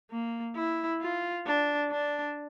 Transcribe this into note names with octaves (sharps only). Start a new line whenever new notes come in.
A#3
E4
F4
D4
D4